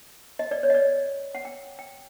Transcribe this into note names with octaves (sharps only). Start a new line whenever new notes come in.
D#5
D5
C#5
D#5
D5
F#5
G5
G5